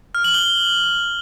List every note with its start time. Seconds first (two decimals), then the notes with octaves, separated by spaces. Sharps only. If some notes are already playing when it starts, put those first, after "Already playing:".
0.15 F6
0.24 F#7
0.34 G7